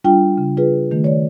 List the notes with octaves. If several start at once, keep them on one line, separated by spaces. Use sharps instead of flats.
G3 D4 F4 G5
C#3
F4 G#4 B4
D#3 A3
C#5 D5